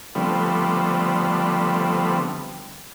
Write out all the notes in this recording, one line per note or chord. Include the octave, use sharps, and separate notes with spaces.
D3 F3 G3 A3 B3 C4